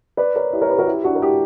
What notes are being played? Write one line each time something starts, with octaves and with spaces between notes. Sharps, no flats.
B4 D5
A#4 C#5
E4 G4
A#4 C#5
G4 B4
F#4 A#4
E4 G4
D4 F#4
A#4
E4 G4